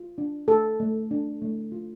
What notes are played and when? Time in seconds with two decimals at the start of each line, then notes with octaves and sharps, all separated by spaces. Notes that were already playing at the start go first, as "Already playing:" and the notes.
Already playing: F4
0.18 D4
0.48 A3 A4
0.80 A3
1.11 D4
1.42 A3
1.72 F4